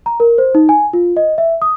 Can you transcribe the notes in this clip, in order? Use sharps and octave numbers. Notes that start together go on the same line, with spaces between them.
A#5
A#4
C5
D#4
G#5
F4
D#5
E5
D#6